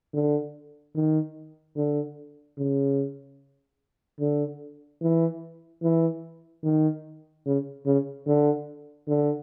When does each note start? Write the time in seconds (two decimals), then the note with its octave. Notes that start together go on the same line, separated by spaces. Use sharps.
0.13 D3
0.95 D#3
1.76 D3
2.58 C#3
4.20 D3
5.02 E3
5.82 E3
6.63 D#3
7.46 C#3
7.86 C#3
8.26 D3
9.08 D3